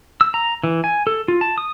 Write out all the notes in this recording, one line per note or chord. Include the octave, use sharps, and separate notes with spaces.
E6
A#5
E3
G#5
A4
F4
A5
D#6